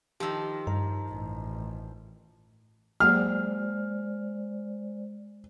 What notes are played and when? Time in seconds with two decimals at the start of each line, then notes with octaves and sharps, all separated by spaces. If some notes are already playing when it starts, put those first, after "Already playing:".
0.20 D#3 F3 G4 E6
0.67 G2 A#5
1.10 A1
3.00 F#3 G#3 A#3 G#4 C5 D5 F6